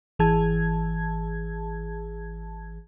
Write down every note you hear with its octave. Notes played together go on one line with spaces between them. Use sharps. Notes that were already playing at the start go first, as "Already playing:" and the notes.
G#1 E3 G#4 A5 G#6